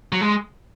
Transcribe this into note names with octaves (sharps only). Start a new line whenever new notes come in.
F#3
G#3